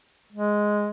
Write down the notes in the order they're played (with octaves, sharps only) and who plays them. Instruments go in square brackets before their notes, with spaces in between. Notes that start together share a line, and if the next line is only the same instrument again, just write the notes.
[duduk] G#3